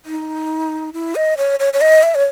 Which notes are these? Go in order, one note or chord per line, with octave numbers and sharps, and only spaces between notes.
D#4
E4
D#5
C#5
C#5
C#5
D#5
E5
C#5